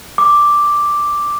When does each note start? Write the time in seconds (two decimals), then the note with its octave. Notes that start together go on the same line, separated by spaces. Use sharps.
0.18 D6